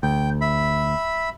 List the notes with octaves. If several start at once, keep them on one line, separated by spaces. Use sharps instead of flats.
D2 G5
E5 B5